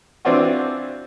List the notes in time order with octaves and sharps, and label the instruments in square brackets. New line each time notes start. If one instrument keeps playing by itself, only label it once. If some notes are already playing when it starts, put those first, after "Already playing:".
[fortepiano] E3 C4 D4 F4 F#4